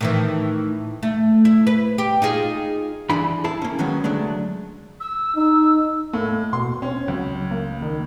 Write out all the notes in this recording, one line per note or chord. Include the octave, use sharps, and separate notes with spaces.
A2 D#3 E3
A3
E4
B4
G4
D#4 F4 G#4
E3 D4 E4 G#4 G#5 B5
E4 G#4 A5
A#3 C#4
D#3 F#3 G#3 B3 C#4
D3 F#3 G#3 A3 D4
E6
D#4 E6
A2 A#3
B2 C6
C4 C#4
C#2 F#3
A#3
D#3